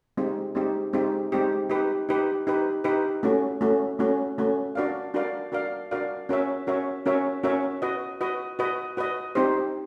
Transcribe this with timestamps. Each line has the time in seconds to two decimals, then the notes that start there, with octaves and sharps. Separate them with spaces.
0.17 G#3 C4 D#4 G4
0.55 G#3 C4 D#4 G4
0.93 G#3 C4 D#4 G4
1.32 G#3 C4 D#4 G4
1.70 D#4 G4 B4
2.09 D#4 G4 B4
2.47 D#4 G4 B4
2.84 D#4 G4 B4
3.23 A3 C#4 F#4
3.61 A3 C#4 F#4
3.99 A3 C#4 F#4
4.38 A3 C#4 F#4
4.75 D4 F#4 A#4 D5 F5
5.14 D4 F#4 A#4 D5 F5
5.52 D4 F#4 A#4 D5 F5
5.91 D4 F#4 A#4 D5 F5
6.29 C#4 F#4 A#4 C#5 E5
6.67 C#4 F#4 A#4 C#5 E5
7.06 C#4 F#4 A#4 C#5 E5
7.43 C#4 F#4 A#4 C#5 E5
7.82 F#4 B4 D#5
8.21 F#4 B4 D#5
8.59 F#4 B4 D#5
8.97 F#4 B4 D#5
9.35 C4 D#4 G4 C5